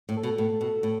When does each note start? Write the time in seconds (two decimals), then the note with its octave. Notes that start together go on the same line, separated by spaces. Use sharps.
0.09 A2
0.16 A4
0.23 B2
0.38 A2 A4
0.61 B2
0.83 A2